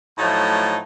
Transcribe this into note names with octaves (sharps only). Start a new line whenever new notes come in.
A2 F3 F#3 A3 D#4